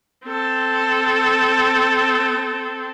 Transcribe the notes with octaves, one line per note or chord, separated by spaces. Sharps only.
C4 A4